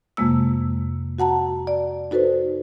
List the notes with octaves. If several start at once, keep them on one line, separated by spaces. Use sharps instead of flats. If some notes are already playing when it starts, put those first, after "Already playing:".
F2 C3 G#3 A#3 E6
F#4 F#5 A5 A#5
D5
D#4 F#4 A4 B4 C5